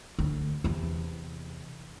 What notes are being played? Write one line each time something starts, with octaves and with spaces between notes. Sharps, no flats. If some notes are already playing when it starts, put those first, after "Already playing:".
D2
E2 C3